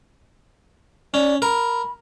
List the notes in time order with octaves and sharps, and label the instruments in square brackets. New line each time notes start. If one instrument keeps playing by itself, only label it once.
[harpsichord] C#4 [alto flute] D5
[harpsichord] A#4 [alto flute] B5